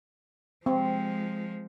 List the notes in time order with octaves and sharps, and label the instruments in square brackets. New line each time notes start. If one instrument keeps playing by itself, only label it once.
[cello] F3 G#3 [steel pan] C4